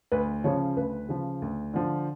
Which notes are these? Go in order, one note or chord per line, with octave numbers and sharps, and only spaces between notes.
D2 B4
C#3 F3 C#5
D2 B4
C#3 F3
D2
D3 F3